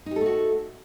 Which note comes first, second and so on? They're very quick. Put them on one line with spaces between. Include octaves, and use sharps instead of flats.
D#4 G4 A4 A3 F#4